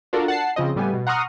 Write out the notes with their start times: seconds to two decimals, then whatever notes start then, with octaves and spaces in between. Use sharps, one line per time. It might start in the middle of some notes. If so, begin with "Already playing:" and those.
0.13 D4 F4 F#4 A4 A#4 D5
0.28 F#5 A5 C7
0.56 C#3 F3 C4 D#5
0.76 A2 G3 B3 G#5
0.93 B2
1.07 F#5 A#5 C6 C#6 D#6 F6